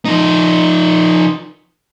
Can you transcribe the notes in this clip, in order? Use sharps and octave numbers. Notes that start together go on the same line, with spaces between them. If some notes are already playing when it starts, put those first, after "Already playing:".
F3 D#4